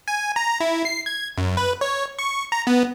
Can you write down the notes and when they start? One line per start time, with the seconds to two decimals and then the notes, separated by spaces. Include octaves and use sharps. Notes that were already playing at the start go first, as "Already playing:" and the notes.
0.08 G#5
0.36 A#5
0.60 E4
0.85 C7
1.06 G#6
1.38 F#2
1.57 B4
1.81 C#5
2.19 C#6
2.52 A#5
2.67 B3